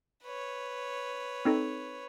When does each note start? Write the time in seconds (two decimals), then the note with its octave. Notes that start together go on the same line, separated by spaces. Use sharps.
0.23 B4 C#5
1.45 C4 D#4 A4